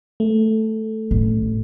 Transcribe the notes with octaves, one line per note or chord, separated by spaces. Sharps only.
A3
A1